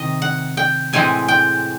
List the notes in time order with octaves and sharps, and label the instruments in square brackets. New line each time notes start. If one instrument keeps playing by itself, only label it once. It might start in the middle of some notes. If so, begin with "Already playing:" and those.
Already playing: [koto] C3 D#3 D#5
F#5
G5
A2 E3 G#3 C4 G#5
G5